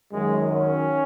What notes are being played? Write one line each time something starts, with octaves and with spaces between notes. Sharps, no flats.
F#2 D#3 F#3 G#3
C#4